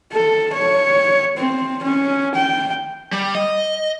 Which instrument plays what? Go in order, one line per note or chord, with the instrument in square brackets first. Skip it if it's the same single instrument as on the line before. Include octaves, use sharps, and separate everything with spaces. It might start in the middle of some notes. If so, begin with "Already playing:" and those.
[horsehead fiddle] A4
C#5
C4
C#4
G5
[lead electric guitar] G3
D#5